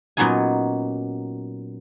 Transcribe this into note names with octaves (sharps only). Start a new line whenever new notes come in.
A#2 F#3 B3 C#4 D#4 G#5